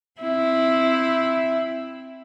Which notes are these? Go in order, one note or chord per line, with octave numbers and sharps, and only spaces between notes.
C4 E4